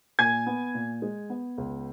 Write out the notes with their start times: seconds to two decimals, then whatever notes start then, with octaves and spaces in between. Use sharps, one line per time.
0.19 A#2 G#5 G#6
0.47 B3
0.74 A#2
1.02 G#3
1.30 B3
1.58 C#2